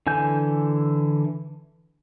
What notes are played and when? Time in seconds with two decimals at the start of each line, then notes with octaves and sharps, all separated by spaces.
0.07 D3 E3 G#5 G6